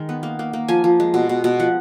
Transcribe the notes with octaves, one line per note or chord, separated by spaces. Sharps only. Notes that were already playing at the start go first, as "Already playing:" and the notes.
Already playing: D#3 G#3
B3
A#3
A#3
A#3
F3 G#5
F3
G#3
B2
B2
B2
F3 F#5